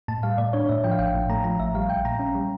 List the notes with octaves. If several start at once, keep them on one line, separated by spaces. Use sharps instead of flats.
A2 A5
G3 F5
A2 D5
D4 C#5
A2 E5
F3 G5
F5
A1 G5
A2
A3 A#5
F3 A#5
A1 E5
G3 F5
A#1 G5
A#2 A#5
C#4
G3